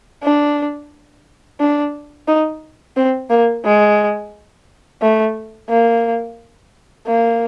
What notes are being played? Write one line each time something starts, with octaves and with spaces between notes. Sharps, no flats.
D4
D4
D#4
C4
A#3
G#3
A3
A#3
A#3